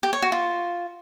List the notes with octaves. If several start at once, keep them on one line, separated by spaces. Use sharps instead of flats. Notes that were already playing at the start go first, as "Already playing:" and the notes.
G4
C#5
F#4
F4